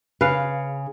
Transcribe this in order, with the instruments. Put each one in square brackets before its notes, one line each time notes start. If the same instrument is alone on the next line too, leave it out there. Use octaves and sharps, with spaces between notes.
[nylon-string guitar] C#3 [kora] B4 F5